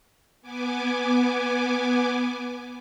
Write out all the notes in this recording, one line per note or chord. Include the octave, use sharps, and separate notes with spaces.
B3 G#5 D6